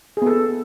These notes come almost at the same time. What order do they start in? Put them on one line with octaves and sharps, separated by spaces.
G#4 B3 A4